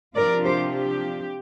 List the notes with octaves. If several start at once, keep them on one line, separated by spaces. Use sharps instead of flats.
C3 F3 D4 F4 A#4 D5
G4 C5
G4